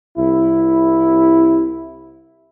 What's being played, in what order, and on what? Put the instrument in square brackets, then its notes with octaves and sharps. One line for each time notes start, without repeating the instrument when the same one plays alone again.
[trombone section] C2 E4